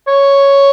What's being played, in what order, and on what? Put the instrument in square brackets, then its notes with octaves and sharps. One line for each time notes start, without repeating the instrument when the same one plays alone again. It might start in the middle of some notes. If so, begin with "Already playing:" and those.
[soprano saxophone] C#5